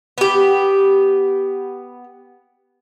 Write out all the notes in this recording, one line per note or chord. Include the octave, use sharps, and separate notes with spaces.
B3 G4